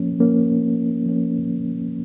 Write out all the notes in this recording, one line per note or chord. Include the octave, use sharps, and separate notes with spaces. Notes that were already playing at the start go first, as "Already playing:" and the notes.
Already playing: F3 A#3 C#4
F3 A#3 C#4
F3 A#3 C#4